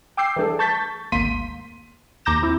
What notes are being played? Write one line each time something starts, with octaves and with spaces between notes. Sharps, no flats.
G5 D6 E6 G6 C7
E3 G3 A3 D4 G#4 A4
A5 C#6 G6 A6 B6
G#1 D2 A#3 C6 B6 D#7
D#2 A#5 D6 G6 A#6 E7
C4 E4